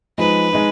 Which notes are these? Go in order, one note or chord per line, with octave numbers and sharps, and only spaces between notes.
F3 G#3 D#4 B4
G#3 D#4